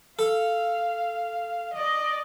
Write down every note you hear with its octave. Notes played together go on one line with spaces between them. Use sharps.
A4 F5
D5 D#5